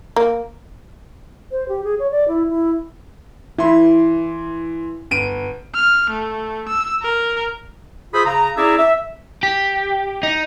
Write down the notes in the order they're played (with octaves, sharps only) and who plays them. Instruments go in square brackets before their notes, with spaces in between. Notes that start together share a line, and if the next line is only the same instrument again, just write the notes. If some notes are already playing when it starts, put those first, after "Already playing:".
[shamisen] A#3
[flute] C5
G4
G#4
C#5
D5
E4
E4
[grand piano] E3 C6 [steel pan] E4
[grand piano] G1 D7 D#7
[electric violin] F6
A3
E6
A#4
[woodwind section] F4 G#4 C5 E5 B5 D#6
C#3 A#5
C#4 E4 G#4 D5 E5 A#5
E5
[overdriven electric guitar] G4
D#4